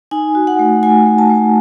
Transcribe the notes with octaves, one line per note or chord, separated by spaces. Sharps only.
D#4 G#5
F#4
F#5
A3
A3 G#5
A3
A5
A3